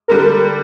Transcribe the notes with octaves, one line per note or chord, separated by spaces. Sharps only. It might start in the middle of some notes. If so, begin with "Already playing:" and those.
D3 G3 A#4